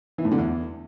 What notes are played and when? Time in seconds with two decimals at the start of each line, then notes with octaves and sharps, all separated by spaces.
0.18 E3
0.25 A2
0.32 D3
0.38 E2